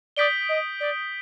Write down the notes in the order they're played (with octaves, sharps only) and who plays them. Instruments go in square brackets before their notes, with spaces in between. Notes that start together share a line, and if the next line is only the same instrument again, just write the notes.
[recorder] D5 [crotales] D#6 G6 B6 D7 G7
[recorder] D#5
D5